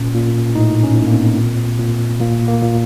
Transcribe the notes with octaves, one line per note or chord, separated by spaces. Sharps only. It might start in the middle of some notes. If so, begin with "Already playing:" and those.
Already playing: A#2 C#4
A#2
A2 D#4
C#4
A2
A#3
C4
A#2
A#2
A#2 A#3
A#3
A#2